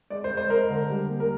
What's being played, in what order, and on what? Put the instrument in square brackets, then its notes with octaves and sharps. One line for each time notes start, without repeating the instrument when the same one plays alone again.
[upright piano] G#3 D5
C5
G#3
C5
G#3 A#4
D3
G3
A#3
A#4